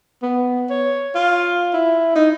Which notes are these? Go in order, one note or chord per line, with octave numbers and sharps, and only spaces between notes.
B3
C#5
F4
E4
D#4